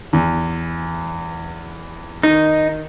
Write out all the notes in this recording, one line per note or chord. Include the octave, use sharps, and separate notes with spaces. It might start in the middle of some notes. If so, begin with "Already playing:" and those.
E2
D#3 D#4